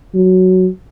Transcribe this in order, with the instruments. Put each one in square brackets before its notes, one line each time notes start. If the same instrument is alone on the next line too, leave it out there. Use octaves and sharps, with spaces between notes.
[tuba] F#3